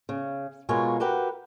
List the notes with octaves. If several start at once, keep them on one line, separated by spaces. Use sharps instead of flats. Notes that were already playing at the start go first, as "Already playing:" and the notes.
C#3
B2 G#3 F4 A#4 C#5 G#5
F#4 G4 A#4 B4 F#5